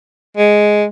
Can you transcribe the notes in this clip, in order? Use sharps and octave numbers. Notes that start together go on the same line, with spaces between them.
G#3